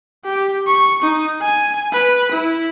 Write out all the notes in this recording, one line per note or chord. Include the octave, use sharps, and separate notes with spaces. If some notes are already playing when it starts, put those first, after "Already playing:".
G4
C#6
D#4
G#5
B4
E4